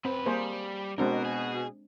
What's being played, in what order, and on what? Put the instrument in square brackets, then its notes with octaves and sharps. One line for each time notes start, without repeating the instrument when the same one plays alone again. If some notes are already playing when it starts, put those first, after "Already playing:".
[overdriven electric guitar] F#2 B4 [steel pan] C4
[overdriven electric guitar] G3 [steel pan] A#3 G#4 C5
[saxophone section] B2 F#4 [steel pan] G#3 C4 D4 [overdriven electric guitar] A#4
[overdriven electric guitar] G#4